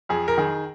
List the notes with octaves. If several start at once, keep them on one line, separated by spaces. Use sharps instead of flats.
F2 G#4
A#4
D#3 G#4